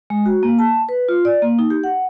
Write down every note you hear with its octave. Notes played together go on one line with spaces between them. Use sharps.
G#3
F#4
A#3
A5
B4
F4
D5
A#3
D#4
G4
F#5